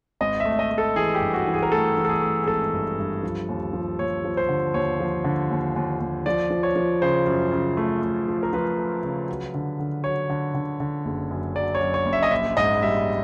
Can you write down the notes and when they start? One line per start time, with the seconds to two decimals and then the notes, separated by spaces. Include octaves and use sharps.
0.21 G#1 D#5
0.40 E5
0.45 A3
0.52 E5
0.59 D#5
0.71 A3
0.78 A4
0.96 E3 G#4
1.15 G4
1.21 G2
1.34 F#4
1.47 E3
1.54 G#4
1.63 A#4
1.72 A3 A4
1.97 E3
2.05 A4
2.09 G#4
2.22 A3
2.43 G#4
2.47 G#1 A4
2.73 G2
2.98 G2
3.23 F3
3.49 D#2
3.73 F3
3.99 D#2 C#5
4.24 F3
4.37 C5
4.49 D3
4.74 D#2 C#5
5.00 F3
5.24 D3
5.51 D#2
5.76 D#2
6.00 D#2
6.26 F3 D5
6.51 F3
6.63 C#5
6.76 F3
7.02 C#3 C5
7.27 F#2
7.52 C#3
7.77 A3
8.02 A3
8.28 F3
8.43 A#4
8.53 F3 B4
8.78 A3
9.03 C#3
9.29 F#3
9.54 D3
9.80 D3
10.04 F#3 C#5
10.30 D3
10.54 D3
10.80 D3
11.05 F#1
11.31 F#2
11.56 F#3 D5
11.75 C#5
11.81 F#2
11.94 C#5
12.06 F#1
12.13 E5
12.23 D#5
12.31 A#1 E5
12.57 G#2 D#5
12.82 G3 E5